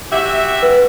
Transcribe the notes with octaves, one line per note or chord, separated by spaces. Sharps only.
F#4 G4 E5
B4